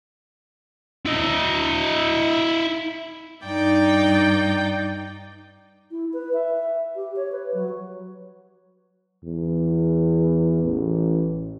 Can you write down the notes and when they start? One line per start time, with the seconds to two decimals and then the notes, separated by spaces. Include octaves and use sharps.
1.06 E4 D#5
3.45 G2 D#4 D5 G5 G6
5.91 E4
6.13 B4
6.34 E5
6.96 G4
7.16 C#5
7.32 B4
7.54 F#3
9.24 E2
10.64 A1